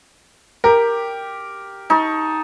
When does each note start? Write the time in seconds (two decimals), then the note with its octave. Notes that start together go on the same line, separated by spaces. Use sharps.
0.64 G4 A#4
1.90 D#4 A5 C#6